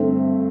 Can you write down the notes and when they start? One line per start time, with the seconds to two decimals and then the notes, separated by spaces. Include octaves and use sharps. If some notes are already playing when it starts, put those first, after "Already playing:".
Already playing: G2 D3 A3 C4 E5